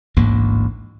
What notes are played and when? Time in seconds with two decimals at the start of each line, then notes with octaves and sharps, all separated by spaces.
0.16 A1 D2 G#2 A#3